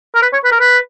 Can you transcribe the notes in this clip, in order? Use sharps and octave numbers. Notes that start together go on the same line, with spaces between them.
A#4
B4
C#5
B4
A#4
B4